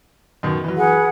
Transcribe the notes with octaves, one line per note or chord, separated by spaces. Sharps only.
F#2 B2 D#3
E3 F#3
G#4 B4 F#5